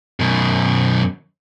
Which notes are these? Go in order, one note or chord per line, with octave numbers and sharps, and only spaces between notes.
F#2 B2